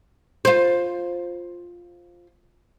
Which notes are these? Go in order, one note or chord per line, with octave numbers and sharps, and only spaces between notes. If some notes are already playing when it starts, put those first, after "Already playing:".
F4 C5